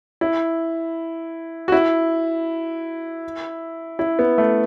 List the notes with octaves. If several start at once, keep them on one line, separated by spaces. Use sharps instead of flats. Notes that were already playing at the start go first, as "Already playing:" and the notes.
E4
F#4
E4
E4
B3
A3